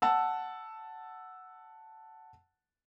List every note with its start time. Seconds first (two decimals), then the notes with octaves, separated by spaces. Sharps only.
0.02 F#5 A5 E6